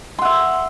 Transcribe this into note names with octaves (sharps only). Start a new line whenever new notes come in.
E5 F#5 C6